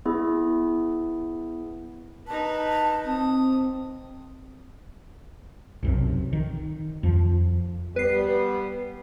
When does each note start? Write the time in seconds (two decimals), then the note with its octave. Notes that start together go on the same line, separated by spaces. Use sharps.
0.06 B3 E4 G#4
2.27 D#4 B4 A5
3.05 C4 D#6
5.83 B1 F#2 C3
6.33 D#3
7.03 F2 F3
7.96 G3 B3 B4 C7